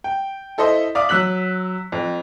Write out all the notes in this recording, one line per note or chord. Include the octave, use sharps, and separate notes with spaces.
G5
E4 A4 C5 D#5 C6
D5 E5 F5 D6 D#6
F#3 E6 F#6 B6 F#7
F2